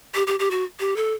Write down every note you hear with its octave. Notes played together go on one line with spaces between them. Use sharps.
G4
G4
G4
F#4
G4
A4